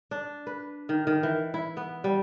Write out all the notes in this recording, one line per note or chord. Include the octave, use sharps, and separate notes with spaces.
D4
B4
D#3
D#3
E3
E4
B3
G3